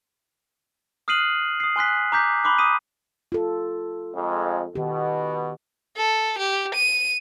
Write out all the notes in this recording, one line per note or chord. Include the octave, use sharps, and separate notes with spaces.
D#6 F6 F#6 C7 D#7 F#7
D#6 C7
G#5 C6 F#6 B6
A#5 D6 G6 B6
B5 C6 D6 F#6
D6 D#6 B6 D#7
F4 A4
F2 G#3
B2 D#3 G4
A4
G4
D#7